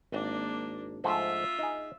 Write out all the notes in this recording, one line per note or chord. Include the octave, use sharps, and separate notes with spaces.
G#1 A#3 D4
G#2 F3 A3 F4 E5
D#4 G#4